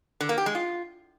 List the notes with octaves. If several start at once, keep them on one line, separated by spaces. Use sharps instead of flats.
D3
A#3
G4
G#3
F4